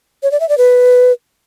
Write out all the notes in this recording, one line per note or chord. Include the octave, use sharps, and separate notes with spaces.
C#5
D5
E5
D5
B4